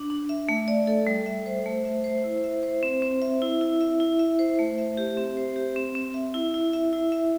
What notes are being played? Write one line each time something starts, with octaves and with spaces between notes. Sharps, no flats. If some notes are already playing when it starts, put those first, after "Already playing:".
Already playing: D4
D4
E5
A3
D5
A4
G3
E5
C5
A3
E5
C5
E4
E5
C5
C4
C4
E5
E4
E4
E5
E4
E5
C5
A3
E5
G4
C4
C5
G4
C4
C4
E5
E4
E4
E5
E4
E5